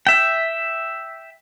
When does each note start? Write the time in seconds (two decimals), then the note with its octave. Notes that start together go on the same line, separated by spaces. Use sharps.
0.07 E5 G5